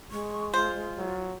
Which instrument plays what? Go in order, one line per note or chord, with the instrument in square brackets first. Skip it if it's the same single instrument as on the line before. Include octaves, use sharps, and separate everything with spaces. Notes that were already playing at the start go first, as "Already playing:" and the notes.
[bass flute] G#3 [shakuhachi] C#6
[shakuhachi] F4 [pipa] C5
[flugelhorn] F#3